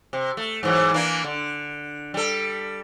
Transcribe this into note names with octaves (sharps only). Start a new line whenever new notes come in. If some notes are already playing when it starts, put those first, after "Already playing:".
C3
A3
G#2 E3 F#3
E3 A#3 D4
D3
G3 A4